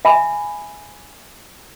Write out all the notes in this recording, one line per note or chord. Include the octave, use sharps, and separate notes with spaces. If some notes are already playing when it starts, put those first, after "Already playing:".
E5 G#5 B5